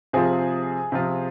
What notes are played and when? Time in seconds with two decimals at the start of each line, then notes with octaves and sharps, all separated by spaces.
0.13 C3 F3 C4 F4 G#4
0.92 C3 F3 C4 F4